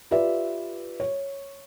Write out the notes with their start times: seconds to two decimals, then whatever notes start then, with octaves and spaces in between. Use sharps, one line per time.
0.11 F4 G4 B4 D5 E5
1.00 C#5